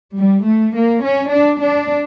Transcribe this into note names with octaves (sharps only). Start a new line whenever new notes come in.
G3
A3
A#3
C#4
D4
D4